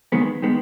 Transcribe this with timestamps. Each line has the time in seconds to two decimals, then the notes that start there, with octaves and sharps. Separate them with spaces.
0.12 D#2 D#3 G#3 B3
0.42 D#3 G#3 B3